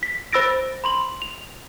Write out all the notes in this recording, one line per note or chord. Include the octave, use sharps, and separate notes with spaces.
B6
C5 B5 E6 A6 A#6 D7
B5 C6 F#7
F7